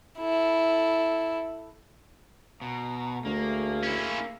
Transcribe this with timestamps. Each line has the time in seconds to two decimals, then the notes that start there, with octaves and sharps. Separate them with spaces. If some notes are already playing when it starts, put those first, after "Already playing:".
0.18 E4 A4
2.61 B2 A#5
3.25 D2 A3 A#3 G#4
3.83 C#4 E4